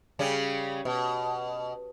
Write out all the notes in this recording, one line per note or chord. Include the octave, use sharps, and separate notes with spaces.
C#3 G3 C#4
B2